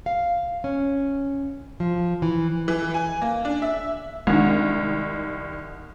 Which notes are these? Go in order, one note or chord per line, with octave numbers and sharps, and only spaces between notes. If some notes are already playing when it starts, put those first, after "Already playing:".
F5
C#4
F3
E3
E3
G#5
A#3
D4
E5
C2 D#3 G#3 D4